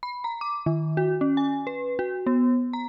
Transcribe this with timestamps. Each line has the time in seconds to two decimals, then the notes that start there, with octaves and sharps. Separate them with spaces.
0.03 B5
0.24 A#5
0.41 D6
0.66 D#3
0.97 F#4
1.21 C#4
1.37 G#5
1.67 B4
1.99 F#4
2.26 B3
2.73 A#5